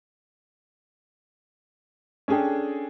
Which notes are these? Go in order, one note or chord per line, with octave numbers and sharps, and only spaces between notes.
C#4 D4 G#4 A4 G5